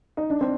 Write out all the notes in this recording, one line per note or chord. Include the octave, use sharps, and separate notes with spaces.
D#4
D4
C4